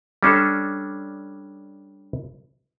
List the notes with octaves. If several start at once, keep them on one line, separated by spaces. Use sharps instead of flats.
G3 C#4 D4 A4